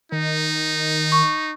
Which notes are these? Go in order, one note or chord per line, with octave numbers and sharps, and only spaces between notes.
D#3 D#4
C#6